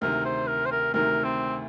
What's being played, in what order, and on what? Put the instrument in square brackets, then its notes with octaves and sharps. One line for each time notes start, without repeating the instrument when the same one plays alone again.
[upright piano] D2 C3 D#3 [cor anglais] A#4
[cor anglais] C5
A#4
C5
A#4
[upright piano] D2 C3 D#3 [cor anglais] A#4
[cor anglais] C4